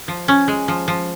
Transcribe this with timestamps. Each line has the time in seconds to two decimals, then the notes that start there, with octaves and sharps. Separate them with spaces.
0.08 F3
0.28 C#4
0.48 G#3
0.68 F3
0.88 F3